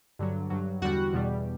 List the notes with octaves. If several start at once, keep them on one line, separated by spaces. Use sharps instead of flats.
G2 D3 F#3
G2 F#3
E2 D3 G3 F#4 F#5
E2 B2 G3